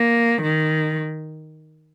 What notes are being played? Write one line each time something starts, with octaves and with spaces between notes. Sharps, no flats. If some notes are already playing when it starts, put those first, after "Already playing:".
Already playing: A#3
D#3